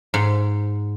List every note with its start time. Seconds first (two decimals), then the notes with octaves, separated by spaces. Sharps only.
0.14 G#2